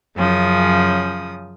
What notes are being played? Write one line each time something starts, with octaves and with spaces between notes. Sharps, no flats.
F#2 C#3 F3 D#6